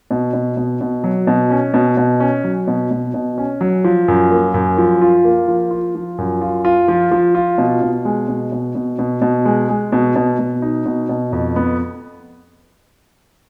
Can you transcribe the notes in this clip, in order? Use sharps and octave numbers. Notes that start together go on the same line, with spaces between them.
B2
B2
B2
B2
F#3
B2
C#4
B2
B2
C#4
F#3
B2
B2
B2
C#4
F#3
F3
F#2
A#3
F#2
F3
F4
A#3
F3
F4
F3
F#2
F4
F4
F3
F3
F4
B2
B2
G#3
B2
B2
B2
B2
B2
G#3
G#3
B2
B2
B2
D#4
B2
B2
F2
B3